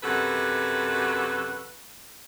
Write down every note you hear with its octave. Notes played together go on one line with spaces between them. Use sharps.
F#2 C3 F#4 A4 B4